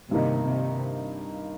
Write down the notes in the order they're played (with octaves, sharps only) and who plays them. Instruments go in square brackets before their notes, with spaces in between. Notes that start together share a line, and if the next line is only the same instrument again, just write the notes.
[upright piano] G2 D#3 A#3 D#4 [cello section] C3
[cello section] C3